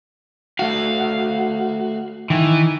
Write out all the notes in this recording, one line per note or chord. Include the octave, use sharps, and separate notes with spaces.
A3 F#4 F5
D#3 E3